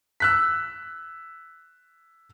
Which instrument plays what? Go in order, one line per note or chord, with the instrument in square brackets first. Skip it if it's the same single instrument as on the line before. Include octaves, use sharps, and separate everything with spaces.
[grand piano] E6 F#6 B6